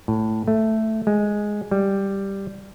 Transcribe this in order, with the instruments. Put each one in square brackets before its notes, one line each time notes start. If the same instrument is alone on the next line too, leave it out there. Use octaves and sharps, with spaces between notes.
[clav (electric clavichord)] A2
A3
G#3
G3